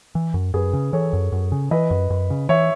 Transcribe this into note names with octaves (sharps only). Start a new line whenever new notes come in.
E3
F#2
F#2 G#4 B4
C#3
E3 A4 C#5
F#2
F#2
C#3
E3 B4 D#5
F#2
F#2
C#3
E3 C#5 E5